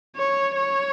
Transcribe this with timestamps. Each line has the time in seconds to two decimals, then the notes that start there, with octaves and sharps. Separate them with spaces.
0.17 C#5
0.56 C#5